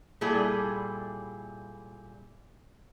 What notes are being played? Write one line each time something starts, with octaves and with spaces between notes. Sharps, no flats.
A#2 G3 E4 G#4 A4